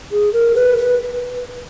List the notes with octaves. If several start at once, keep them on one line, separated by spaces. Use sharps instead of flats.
G#4
A#4
B4
B4